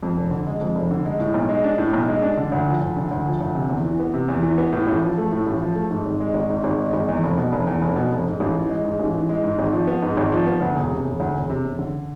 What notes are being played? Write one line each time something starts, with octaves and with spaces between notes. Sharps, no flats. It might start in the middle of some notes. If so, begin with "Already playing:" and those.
F2
F1
D3
G#3
F2
F1
D3
G#3
A2
B1
G#3
D4
A2
B1
G#3
D4
D3
D2
F3
D2
D3
D2
F3
D2
C3
E2
E3
B3
C3
E2
E3
B3
A2
A1
F3
A3
A2
A1
F3
A3
G#2
G#1
G#3
G#1
G#2
G#1
G#3
G#1
E2
F1
B2
F1
E2
F1
B2
F1
G#2
A1
E3
G#3
G#2
A1
E3
G#3
G#2
G#1
F3
B3
G#2
G#1
F3
B3
D2
E1
C3
E1
D2
E1
C3
E1
D3